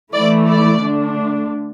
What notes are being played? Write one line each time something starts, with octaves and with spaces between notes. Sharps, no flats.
E3 A3 E4 D5
D5
D3 A3 D4